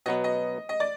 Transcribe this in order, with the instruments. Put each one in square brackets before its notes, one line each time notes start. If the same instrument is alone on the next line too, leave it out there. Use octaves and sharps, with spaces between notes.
[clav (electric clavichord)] B2 F#3 B3 [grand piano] D#5
[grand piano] D#5
D#5
D5